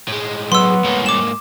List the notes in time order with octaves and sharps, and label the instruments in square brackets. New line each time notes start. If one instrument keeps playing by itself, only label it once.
[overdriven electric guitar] A2 G#3
[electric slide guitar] F#3 [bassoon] B3 [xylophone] C6 E6
[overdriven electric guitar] G#2 A#3 [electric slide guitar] G3 G#4 C#5
[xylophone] D6 E7